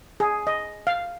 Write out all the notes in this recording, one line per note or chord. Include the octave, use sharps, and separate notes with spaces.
G#4
D#5
F5